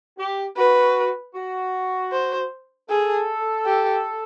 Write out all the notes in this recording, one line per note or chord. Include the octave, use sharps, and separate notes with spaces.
G4
F#4 B4
F#4
C5
G#4 A4
G4